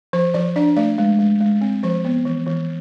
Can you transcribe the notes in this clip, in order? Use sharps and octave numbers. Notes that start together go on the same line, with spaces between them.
F3 C5
F3 D5
D4 D5
A3 D5
G#3
G#3
G#3
C4
F3 C5
B3
E3
E3